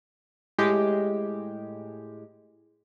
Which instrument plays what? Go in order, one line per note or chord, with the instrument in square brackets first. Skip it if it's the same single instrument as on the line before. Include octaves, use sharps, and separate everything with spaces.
[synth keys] A2 G#3 G4